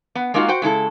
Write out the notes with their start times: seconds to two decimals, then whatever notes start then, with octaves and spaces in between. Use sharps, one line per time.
0.15 B3
0.34 G#3 A#3 D#4 F4 F#4
0.48 F#4 C5 G5
0.62 C#3 G#3 E4 A4